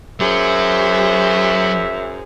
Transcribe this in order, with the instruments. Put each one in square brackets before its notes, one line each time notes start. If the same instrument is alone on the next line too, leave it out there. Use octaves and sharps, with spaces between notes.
[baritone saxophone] F#2 [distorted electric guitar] F#3 [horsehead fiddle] G#4 C5 [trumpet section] E5